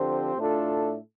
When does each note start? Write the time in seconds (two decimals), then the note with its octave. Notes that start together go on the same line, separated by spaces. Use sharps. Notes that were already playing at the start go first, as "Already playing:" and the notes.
Already playing: D3 F3 C4 G4 C5
0.36 A2 A3 D4 F4 A4